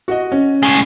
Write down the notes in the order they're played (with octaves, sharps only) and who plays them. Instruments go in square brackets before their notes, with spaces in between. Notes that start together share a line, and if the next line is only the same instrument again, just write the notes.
[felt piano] F#4 D#5
C#4
[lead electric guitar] A2 G#3